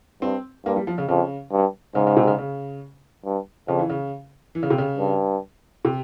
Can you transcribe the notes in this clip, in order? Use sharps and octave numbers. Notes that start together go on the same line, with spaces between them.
G2 C4
G2 A#3
G3
F3
C#3
F2 C#3
G2
G#2 C#3
C#3
C3
C#3
C#3
G2
F2 C#3
E3
C#3
E3
C#3
C3
C#3
G2
C3